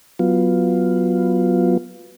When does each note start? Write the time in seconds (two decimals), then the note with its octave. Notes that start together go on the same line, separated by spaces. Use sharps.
0.19 F#3 B3 F4